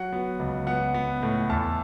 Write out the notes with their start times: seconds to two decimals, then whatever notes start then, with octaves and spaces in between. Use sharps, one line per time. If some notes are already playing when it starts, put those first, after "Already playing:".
Already playing: F#3 F#5
0.13 B3
0.39 C#2
0.67 B3 F#5
0.94 B3
1.23 A2
1.50 E2 A5